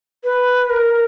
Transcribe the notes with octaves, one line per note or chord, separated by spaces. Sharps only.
B4
A#4